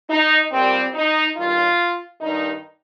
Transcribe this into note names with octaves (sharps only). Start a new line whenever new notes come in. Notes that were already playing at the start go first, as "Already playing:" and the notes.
D#4
A#2 G3 C4
D#4
G2 D#3 G3 F4
G2 D#3 G3 D#4